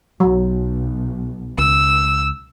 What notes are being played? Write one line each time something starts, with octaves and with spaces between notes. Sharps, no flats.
B1 F#3
C#2 E6